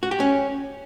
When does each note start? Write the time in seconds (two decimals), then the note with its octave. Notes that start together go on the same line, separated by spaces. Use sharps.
0.03 F#4
0.11 G4
0.20 C#4